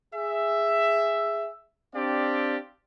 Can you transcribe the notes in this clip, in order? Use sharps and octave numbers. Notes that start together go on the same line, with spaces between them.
G#4 E5
C4 D4 G4 D5 F5